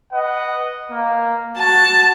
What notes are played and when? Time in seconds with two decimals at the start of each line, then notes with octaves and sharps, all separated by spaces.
0.12 B4 D#5 F#5
0.91 A#3
1.58 F#4 A5